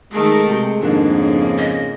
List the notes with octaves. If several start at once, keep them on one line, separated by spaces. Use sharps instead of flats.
D#3 G#3 A3 G#4 A#4
C3
F2 G#2 D#3 A#3 D4
C#3
D#5